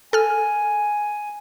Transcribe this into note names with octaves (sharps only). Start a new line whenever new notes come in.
A4 G#5 F6